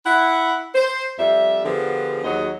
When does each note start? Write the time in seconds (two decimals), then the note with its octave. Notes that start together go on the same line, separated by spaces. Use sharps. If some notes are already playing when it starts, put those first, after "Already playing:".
0.05 E4 F#5
0.75 C5
1.19 F2 G3 E5
1.64 D3 F3 B3 G4 G#4
2.23 D#2 F#3 F#4 G#4 D#5